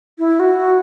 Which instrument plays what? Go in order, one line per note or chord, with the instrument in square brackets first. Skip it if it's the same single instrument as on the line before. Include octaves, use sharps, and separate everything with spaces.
[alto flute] E4
F#4